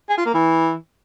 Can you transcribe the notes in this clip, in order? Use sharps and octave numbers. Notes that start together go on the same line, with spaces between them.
G#4
F4
A#3
E3